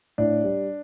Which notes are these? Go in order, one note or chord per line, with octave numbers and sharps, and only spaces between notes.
A2 D4
G3